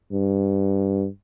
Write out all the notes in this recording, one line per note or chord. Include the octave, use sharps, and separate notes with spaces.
G2